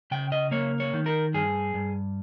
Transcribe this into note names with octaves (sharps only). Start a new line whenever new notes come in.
C#3 G5
D#5
A#3 C#5
C#5
D#3
A#4
G2 G#4
G2